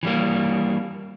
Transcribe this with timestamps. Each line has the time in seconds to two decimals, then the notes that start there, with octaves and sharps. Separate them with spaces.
0.03 E3 G3 A#3